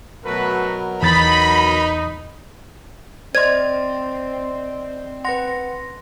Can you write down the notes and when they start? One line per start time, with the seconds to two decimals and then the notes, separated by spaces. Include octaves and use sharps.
0.24 B2 F#3 A3 F#4 A#4 B4
1.03 E2 D#4 B5 A6
3.35 C4 C5 D5 D#5 C6 G#6
5.25 B4 F#5 C6 A#6